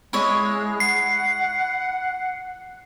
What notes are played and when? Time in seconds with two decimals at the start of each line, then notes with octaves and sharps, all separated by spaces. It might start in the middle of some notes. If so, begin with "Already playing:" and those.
0.13 G#3 E4 C#5 D#5
0.80 F#5 C7